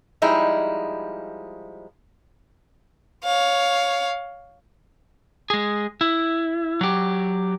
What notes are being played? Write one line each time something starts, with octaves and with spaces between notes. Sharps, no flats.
F3 G3 G#3 D#4 E4
C#5 F5
G#3 G#4
E4
F#3 G4